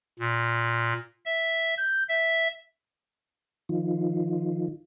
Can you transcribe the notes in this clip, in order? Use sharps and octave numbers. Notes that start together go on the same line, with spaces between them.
A#2
E5
G6
E5
D#3 F3